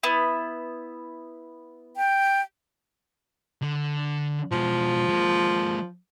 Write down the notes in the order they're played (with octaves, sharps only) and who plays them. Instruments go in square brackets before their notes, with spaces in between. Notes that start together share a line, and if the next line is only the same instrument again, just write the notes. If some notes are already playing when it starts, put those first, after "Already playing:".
[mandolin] B3 E4
[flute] G5
[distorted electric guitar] D3
[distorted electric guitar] B2 G#3 [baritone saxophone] F3
[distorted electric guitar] G#3 A#3